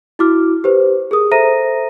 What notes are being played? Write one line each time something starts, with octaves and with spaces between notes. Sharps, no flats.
E4 F#4 D6 F6
G4 B4 C5
G#4 A#4 D#6
A4 C5 E5 A#5 A#6 D#7